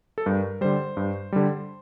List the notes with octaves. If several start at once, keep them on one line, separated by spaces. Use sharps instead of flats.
A4
G2 A#4
D3 G3 C5
G2
D3 G3